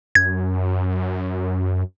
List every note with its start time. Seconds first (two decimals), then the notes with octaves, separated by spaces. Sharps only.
0.15 F#2 G#6